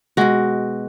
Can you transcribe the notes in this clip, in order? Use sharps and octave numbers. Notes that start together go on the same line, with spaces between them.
B2 G#3 F#4